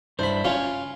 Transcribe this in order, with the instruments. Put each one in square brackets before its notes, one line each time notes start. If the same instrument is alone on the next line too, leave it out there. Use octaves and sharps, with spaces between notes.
[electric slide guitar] G2 D4 E4 [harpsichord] C5 B5
[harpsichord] C#4 F4 [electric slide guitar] F5 G#5